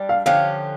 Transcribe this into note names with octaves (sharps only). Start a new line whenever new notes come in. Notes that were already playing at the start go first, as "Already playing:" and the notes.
Already playing: G3 D4
F5
D3 F3 C#4 G4 F5